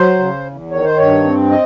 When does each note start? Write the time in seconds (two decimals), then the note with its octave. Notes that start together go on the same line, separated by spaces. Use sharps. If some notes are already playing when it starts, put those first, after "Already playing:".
Already playing: F#3 C5
0.19 C#3
0.45 E2
0.71 D#3 C#5
0.85 C5
0.98 G2 C#5
1.24 C4
1.51 D#5